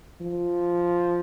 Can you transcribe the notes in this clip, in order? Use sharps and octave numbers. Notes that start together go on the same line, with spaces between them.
F3